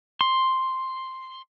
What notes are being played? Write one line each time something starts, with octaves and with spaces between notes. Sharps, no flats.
C6